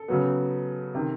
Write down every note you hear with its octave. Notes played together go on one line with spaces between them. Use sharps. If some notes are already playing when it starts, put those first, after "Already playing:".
Already playing: A4
C#3 F#3 B3
C3 D#3